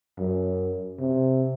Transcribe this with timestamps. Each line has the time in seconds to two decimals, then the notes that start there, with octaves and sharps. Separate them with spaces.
0.19 F#2
0.99 C3